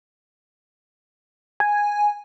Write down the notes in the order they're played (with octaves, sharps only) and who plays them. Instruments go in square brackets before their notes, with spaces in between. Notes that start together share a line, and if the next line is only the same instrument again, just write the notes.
[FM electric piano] G#5